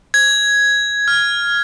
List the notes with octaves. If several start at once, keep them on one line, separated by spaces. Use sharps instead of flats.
G#6
F6